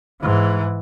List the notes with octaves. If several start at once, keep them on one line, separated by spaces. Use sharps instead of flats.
G#2 E3